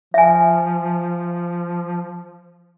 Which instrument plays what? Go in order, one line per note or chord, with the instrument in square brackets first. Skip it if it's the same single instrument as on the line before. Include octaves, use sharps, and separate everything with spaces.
[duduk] F3 [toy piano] E5 G#5